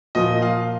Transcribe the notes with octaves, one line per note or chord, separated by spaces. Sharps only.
A#2 F3 A#3 F4 D#5
F5